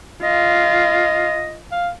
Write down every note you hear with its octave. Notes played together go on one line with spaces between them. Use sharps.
F4 D#5
F5